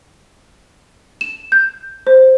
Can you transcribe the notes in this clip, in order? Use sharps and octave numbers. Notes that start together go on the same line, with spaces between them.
E7
G6
C5